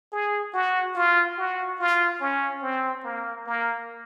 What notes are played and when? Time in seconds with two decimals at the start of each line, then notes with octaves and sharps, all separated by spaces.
0.12 G#4
0.54 F#4
0.95 F4
1.38 F#4
1.79 F4
2.21 C#4
2.62 C4
3.04 A#3
3.46 A#3